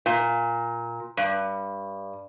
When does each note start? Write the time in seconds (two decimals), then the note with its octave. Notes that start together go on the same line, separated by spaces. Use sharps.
0.06 A#2
1.17 G2